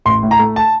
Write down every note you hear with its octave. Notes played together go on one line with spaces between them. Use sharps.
A1 C6
A2
A#5
A3
A5